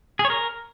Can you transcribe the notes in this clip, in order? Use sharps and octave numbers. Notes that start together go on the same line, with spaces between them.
G#4
C#5
A#4